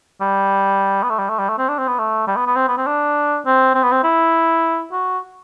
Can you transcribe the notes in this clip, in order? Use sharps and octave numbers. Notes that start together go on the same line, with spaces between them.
G3
B3
A3
G3
A3
G3
A3
C4
D4
C4
B3
A3
G3
B3
B3
C4
B3
C4
D4
C4
C4
B3
C4
E4
F#4